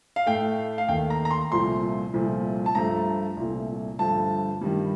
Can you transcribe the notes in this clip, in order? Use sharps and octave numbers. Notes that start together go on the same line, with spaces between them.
F5
A2 A3 G5
F5
D#2 D#3 A3 G5
A#5
A#5
C6
C2 A#2 F3 A3 C6
C2 A#2 F3 A3
A5
G2 F3 A3 A#5
C2 A#2 A3
G2 D3 F3 A3 A5
G2 D#3 G3